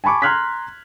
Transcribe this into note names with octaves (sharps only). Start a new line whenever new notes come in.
G#5 A5 B5 C#6 D6
A#5 C6 F6 F#6 G#6 B6